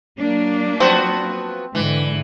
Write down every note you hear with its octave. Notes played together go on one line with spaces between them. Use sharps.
F#3 A#3 D4
F3 B3 C4 F#4
G#2 D3 E3 G#3